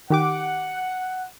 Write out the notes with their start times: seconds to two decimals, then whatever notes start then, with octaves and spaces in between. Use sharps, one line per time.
0.10 D#3 G4 F#5 D6